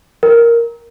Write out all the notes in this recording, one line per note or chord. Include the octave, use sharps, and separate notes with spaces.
A#4